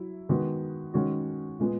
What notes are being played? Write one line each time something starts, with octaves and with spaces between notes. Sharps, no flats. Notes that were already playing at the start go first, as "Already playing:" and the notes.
Already playing: F#3 E4
D#3 G#3 B3 F#4
D#3 G#3 C#4 F#4
A#2 G#3 B3